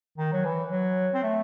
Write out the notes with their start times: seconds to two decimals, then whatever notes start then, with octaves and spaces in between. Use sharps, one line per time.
0.18 D#3
0.33 F#3
0.45 E3
0.71 F#3
1.14 C4
1.23 A3